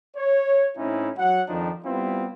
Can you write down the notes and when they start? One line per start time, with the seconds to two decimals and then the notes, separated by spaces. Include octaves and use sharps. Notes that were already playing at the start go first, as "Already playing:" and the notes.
0.16 C#5
0.77 A2 C4 C#4 D#4 E4
1.17 F#3 F#5
1.48 F2 D#3 F3 D4 D#4
1.84 G3 B3 C4 E4 F4